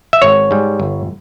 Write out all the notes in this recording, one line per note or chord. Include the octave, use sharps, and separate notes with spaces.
E5
G#1 C#5
G#2 G3
G1